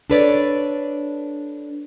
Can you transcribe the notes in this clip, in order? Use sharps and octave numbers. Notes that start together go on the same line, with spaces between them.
D4 A4 B4 C#5 D5